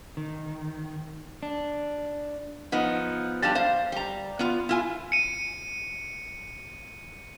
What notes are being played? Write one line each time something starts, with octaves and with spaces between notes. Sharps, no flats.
D#3
D4
F3 B3 D#4
F3 G3 D4 F5 A5 A#5
C5 F5
G3 A#5
B3 F4
E4 F4 G#5
C#7 D#7